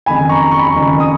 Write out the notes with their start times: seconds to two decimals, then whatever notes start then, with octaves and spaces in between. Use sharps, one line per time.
0.06 F#1 F2 D#3 G#5 B5
0.29 A#5 C#6
0.51 C#6
0.59 B5
0.67 A#5 C#6
0.74 F#1 F2 D#3
1.00 D#6